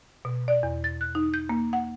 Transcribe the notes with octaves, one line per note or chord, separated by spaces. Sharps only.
B2
D5
E2
A6
F#6
D#4
G6
A#3
F#5